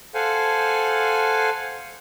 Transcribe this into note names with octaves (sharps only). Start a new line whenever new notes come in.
A4 C5 F5 F#5 G#5